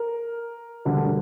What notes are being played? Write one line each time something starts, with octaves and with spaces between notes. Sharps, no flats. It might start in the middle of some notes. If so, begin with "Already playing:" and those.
Already playing: A#4
E1 D2 D3 G3